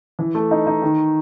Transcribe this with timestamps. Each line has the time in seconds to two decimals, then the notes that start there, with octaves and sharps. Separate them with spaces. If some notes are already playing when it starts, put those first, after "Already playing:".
0.19 E3
0.35 A3
0.51 D#4
0.67 D#4
0.82 D#3